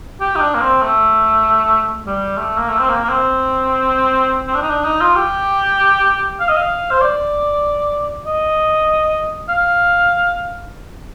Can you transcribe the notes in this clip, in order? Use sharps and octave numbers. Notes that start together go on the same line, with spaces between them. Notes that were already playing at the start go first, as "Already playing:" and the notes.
G4
D#4
D4
A#3
C4
A3
G3
A3
A#3
A3
C4
A#3
A#3
C4
C4
D4
D#4
D4
D#4
F4
G4
F5
D#5
F5
C5
D5
D#5
F5